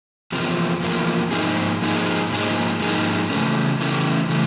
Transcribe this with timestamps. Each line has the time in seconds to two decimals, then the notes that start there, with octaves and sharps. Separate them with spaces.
0.32 E2 C3 F3 A#3
0.82 E2 C3 F3 A#3
1.31 G#2 F3 A#3 D#4 G#4
1.81 G#2 F3 A#3 D#4 G#4
2.30 G#2 F3 A#3 D#4 G#4
2.80 G#2 F3 A#3 D#4 G#4
3.30 C#3 E3 A3 C#4
3.80 C#3 E3 A3 C#4
4.29 C#3 E3 A3